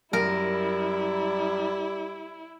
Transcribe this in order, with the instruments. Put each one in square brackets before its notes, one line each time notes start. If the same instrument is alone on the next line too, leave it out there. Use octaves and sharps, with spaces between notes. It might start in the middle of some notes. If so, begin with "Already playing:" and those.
[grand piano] F#2 [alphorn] G3 [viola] E4 [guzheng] A#4